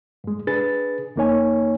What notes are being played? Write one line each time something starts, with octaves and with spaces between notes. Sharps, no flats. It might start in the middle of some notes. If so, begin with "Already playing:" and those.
G2 G#3
D4 G#4 B4 A6
F2 D#3 A#3 D#4 C#5 G#5